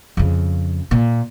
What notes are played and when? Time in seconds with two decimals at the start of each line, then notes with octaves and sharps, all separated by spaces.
0.17 F2 C#3
0.91 A#2